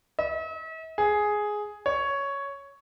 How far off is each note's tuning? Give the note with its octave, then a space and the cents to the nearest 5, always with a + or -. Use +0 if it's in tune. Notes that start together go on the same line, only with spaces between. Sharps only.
E5 -45
G#4 +5
C#5 +5